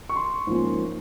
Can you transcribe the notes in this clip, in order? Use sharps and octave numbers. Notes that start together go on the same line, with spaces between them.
C#6
C6
G#2 F3 A#3 C#4